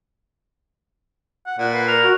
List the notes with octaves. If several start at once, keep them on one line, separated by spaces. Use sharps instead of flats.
F#5
A#2 F#5
B4 C7
A#4 F7
F#4